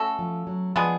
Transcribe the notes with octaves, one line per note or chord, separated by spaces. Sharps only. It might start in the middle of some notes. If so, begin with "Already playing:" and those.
Already playing: A3 C#4 F#4 A4
F3
F#3
F3 G#3 B3 D4 G#4